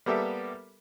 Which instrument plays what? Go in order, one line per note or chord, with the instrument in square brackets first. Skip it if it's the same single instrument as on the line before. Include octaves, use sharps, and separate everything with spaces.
[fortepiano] G3 A#3 B3 G4 A4 E5